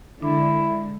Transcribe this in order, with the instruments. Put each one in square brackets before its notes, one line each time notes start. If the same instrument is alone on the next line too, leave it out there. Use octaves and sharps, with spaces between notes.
[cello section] D3 G#3 [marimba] D4 [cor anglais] E4